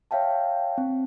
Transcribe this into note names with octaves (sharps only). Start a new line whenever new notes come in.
C#5 E5 F5 G5 A5
C4